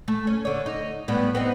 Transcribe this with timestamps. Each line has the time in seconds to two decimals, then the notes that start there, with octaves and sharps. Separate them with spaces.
0.08 A3
0.27 C#4
0.45 D3 C#5
0.66 D#4
1.08 A2 G3 B3
1.35 B3 C4 D#4